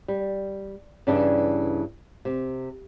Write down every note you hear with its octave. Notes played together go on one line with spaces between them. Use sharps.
G3
G2 C#3 E3 C#4 D4
C3